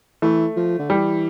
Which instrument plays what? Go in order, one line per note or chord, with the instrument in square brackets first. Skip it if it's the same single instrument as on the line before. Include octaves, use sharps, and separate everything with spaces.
[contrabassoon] E3 [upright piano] A3
[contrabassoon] F3
D3
[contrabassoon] E3 [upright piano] G3